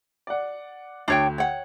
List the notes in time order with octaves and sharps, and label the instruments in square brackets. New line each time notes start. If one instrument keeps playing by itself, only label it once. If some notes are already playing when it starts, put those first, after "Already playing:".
[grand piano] D5 F#5
[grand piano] D2 [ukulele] D4 C#5 G5
[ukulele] C#5 F#5 [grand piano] G5